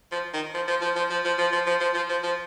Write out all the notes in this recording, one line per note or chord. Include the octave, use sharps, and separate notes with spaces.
F3
D#3
F3
F3
F3
F3
F3
F3
F3
F3
F3
F3
F3
F3
F3